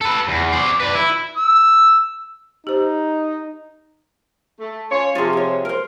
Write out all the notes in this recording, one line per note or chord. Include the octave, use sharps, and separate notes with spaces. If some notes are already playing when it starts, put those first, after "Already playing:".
A4 B4
E2
C5 D5
B4 D5
E4
E6
D#4 G4 C5
A3
C#4 F4 C#5
C3 F3 F4 G#4
G#4 C#5
A#4 C5